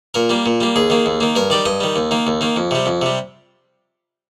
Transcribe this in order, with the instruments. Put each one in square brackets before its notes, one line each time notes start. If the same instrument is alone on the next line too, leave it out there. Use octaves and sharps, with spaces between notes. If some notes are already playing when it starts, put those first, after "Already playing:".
[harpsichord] A#2 A#4
G3 A#3
A#2
G3 A#3
D#2 G#4
D#3 A#3
D#2
D#3 A#3
G2 A#4
D#3 G3 D5
G2 D#5
D#3 G3
D#2
D#3 A#3
D#2
D#3 A#3
F2
C3 G3
F2
C3 G3